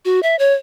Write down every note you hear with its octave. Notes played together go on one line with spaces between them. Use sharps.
F#4
E5
C#5